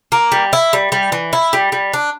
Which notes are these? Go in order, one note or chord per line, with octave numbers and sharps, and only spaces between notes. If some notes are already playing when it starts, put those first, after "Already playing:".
A#3
G3
E4
G3
G3
E3
E4
G3
G3
D4